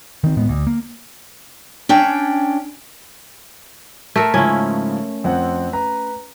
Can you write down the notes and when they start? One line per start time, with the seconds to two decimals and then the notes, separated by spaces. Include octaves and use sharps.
0.24 D#3 C4
0.37 A2 G#3 B3
0.49 D2
0.67 A#3
1.89 C#4 D4 G5
4.16 A3 A#4 E5
4.34 G#2 C#3 F3 C#4 E4
5.24 F2 C4 F#5
5.73 B4 A#5